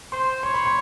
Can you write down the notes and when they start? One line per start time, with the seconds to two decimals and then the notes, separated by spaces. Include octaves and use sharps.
0.12 C5 C6
0.43 C#5 C6
0.54 B5
0.66 C6